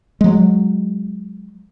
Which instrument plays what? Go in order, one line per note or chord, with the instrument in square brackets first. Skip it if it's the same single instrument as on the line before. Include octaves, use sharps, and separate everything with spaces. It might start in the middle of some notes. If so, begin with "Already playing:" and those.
[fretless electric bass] F#3 G#3